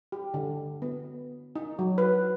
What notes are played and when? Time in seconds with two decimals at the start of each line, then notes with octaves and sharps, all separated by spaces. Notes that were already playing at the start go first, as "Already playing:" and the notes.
0.12 G4
0.34 D3
0.82 B3
1.56 D#4
1.79 F#3
1.98 B4